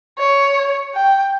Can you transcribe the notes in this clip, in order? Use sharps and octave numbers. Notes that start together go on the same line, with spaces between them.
C#5
G5